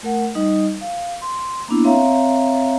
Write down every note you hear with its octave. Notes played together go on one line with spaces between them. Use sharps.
A3 A#4 F#5
G3 D#4 D#5
F5
C6
A#3 B3 D4 E4
C4 C#5 E5 F5 A#5